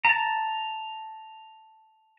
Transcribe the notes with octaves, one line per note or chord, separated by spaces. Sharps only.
A5 A#5